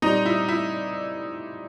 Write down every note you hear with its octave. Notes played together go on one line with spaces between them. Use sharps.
A#2 G3 C4 D#4
E4
E4